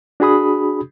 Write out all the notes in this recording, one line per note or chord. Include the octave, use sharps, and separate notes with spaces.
D4 F#4 G#4 B5 D#6